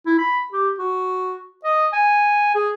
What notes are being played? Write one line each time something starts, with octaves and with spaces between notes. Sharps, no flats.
E4
B5
G4
F#4
D#5
G#5
G#4